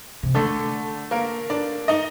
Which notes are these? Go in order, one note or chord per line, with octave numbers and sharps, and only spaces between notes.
C3
D3 A3 A4
A#3 A#4
D4 D5
D#4 D#5